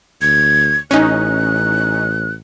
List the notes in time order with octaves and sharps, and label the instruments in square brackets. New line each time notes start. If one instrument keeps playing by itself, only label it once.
[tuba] D2 [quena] G#6
[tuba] A1 [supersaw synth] C#4 D#4 [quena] F#6